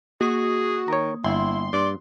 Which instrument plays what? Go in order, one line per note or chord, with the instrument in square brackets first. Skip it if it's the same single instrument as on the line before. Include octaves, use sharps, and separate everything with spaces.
[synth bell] A#3 D#6 [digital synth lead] F#4 [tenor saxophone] G#4
[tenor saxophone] D#3 [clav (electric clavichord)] C#5 A#5
[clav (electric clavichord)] G1 [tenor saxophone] E4 [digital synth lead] C6
[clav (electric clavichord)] G2 [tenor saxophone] D5